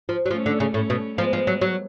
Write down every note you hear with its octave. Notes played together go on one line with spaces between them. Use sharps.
F3
F#3
F3 A3 C#4
D3
C#3
A2 A3 C#4
B2
F3 G#3 B3
F3
F#3
F#3